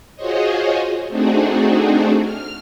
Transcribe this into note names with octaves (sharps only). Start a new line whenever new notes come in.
F4 F#4 G#4 C5 C#5 D#5
A3 C4 D4 D#4 F#4 G#4
F6